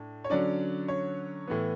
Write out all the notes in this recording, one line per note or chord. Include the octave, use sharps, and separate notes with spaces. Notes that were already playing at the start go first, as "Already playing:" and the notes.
Already playing: A2 D4
C#5
D3 F#3 C#4 D5
C#5
A2 E3 B3